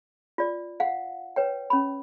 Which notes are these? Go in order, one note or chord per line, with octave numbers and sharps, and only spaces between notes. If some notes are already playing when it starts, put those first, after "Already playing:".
F4 D5
F5 F#5
B4 C#5 G5
C#4 B5